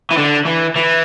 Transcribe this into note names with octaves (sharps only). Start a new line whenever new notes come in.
E3
D3
E3
E3